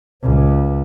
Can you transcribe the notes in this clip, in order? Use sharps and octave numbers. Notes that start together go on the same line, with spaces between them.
C#2